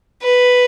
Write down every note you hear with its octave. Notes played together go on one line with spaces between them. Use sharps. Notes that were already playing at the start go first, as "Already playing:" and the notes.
B4